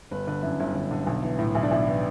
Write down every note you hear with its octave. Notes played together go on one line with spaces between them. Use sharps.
G1 B4
D3 B4
F#2 E4
G1 E4
G1
D3
B1
E3
A2
B1 E4
D4
B1 E4
E3